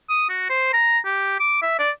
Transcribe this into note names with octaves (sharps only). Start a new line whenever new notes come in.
D#6
F#4
C5
A#5
G4
D6
E5
D5